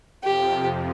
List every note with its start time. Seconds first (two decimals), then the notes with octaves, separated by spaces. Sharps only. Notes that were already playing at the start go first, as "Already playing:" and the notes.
0.24 F2 C3 F3 G4